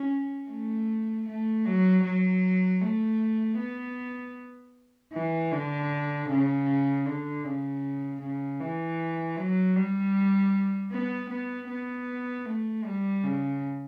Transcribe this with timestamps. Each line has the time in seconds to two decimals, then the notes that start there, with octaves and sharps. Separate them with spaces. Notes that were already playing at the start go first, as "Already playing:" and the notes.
Already playing: C#4
0.50 A3
1.28 A3
1.65 F#3
2.04 F#3
2.81 A3
3.58 B3
5.13 E3
5.52 D3
6.29 C#3
7.05 D3
7.44 C#3
8.21 C#3
8.60 E3
9.36 F#3
9.76 G3
10.91 B3
11.30 B3
11.68 B3
12.45 A3
12.84 G3
13.23 C#3